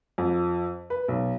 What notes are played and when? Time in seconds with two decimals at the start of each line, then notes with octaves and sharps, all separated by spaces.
0.18 F2
0.90 B4
1.08 B1